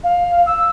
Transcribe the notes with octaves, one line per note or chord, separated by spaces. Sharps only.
F5
E6